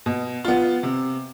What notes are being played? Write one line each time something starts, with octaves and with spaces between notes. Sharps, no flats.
B2
B3 F4
C3